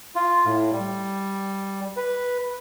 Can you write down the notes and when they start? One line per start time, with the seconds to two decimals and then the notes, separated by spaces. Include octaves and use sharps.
0.15 F4
0.46 A2
0.72 G3
1.97 B4